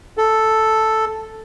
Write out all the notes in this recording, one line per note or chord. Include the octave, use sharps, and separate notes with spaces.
A4